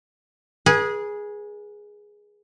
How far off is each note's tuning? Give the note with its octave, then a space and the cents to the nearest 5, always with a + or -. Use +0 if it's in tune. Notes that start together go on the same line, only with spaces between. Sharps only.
G#4 +0 B4 -40